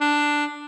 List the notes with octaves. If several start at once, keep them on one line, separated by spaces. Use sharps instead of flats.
D4